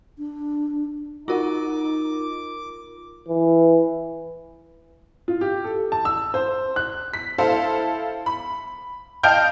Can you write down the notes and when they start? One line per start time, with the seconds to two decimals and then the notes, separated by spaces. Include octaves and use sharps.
0.18 D4
1.28 D#4 F4 F#4 A#4 F#5 D6
3.29 E3
5.28 F4
5.41 G4
5.64 A4
5.92 A5
6.05 E6
6.34 C5
6.76 F#6
7.14 B6
7.38 E4 A4 C5 F5
8.26 B5
9.23 D#5 F5 G5 A5 F6 G6